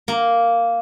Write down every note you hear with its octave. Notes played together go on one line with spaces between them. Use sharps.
A#3